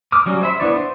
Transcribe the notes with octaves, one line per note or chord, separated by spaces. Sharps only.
D6 D#6 F6
F#3 G3 C#4 F#4
C5 E5 B5
B3 D4 E4 C#5 D5
C5